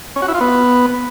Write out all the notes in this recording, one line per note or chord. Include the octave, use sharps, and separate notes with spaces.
C#4
F#4
E4
F4
B3